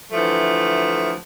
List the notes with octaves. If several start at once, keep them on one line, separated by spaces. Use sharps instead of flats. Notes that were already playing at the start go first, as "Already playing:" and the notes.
D2 E3 F3 A3